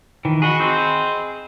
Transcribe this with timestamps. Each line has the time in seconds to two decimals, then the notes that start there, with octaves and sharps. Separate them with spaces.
0.25 D#3 E3
0.42 F#4 G#4 D#5 B5
0.60 C4